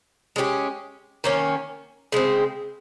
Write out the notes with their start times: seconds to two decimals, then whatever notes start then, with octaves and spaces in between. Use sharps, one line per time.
0.36 G#3 C#4 G4
1.24 D#3 A#3 C#4
2.12 C#3 G#3 C4